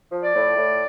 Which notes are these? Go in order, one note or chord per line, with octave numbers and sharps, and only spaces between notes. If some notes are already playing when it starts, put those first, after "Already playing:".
F3
D5
A2
A2